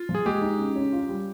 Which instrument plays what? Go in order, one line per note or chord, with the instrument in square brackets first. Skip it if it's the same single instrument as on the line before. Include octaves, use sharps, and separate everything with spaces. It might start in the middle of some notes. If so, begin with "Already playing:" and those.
Already playing: [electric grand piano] F4
[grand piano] F3
[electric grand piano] G#4
[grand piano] G#3 [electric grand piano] G4
[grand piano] D#4
C#3
C#4
F4
G3